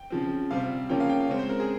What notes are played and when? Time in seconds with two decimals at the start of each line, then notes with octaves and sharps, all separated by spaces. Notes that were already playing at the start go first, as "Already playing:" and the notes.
Already playing: G5
0.10 C#3 F3 C4
0.51 C3 G3 C4 F5
0.90 C#3 F3 A#3 C#4 G5
1.00 F5
1.10 G5
1.20 F5
1.29 C#3 G#3 C4 C#5
1.39 C5
1.49 A#4
1.60 G#4